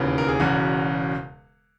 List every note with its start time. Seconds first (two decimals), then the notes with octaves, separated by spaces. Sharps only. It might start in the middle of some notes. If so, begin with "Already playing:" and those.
Already playing: E1 D#2 C#3 E3 B3
0.18 A#4
0.28 G#4
0.40 E1 E2 C#3 F#4